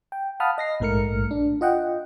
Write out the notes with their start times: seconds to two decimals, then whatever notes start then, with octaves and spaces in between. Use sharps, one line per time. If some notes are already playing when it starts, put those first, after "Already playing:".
0.12 G5
0.40 F5 F#5 A5 B5 D#6 F6
0.58 D#5 A#6 C7
0.80 A#1 G#2 A3 A#4 F6 C#7
1.31 D4
1.61 F4 D#5 F#5 G5